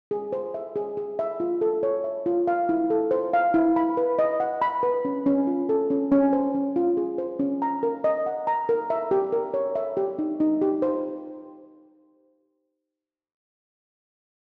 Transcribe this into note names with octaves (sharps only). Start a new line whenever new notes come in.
G#4
C5
E5
G#4
G#4
E5
F4
A4
C#5
E5
F4
F5
E4
A4
C5
F5
E4
B5
B4
D#5
F#5
B5
B4
C#4
C#4
F4
A4
C#4
C#4
C5
C#4
F4
G#4
C5
C#4
A#5
A#4
D#5
F#5
A#5
A#4
E5
G4
A#4
C#5
E5
G4
D#4
D#4
G4
C5